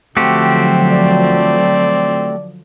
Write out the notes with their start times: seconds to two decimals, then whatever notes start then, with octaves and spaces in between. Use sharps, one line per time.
0.17 D3 F3 F#3 A3 C4 F#4 G4
0.92 D5